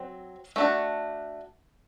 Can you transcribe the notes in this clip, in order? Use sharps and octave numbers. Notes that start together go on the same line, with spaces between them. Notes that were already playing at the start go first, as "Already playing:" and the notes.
Already playing: F#3 C4
A3 D4 F#4